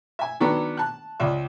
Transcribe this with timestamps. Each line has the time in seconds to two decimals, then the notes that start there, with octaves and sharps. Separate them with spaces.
0.19 E5 G#5
0.40 D#3 F#3 B3 D4 A4
0.77 A5 F#6
1.20 C#2 D5 E5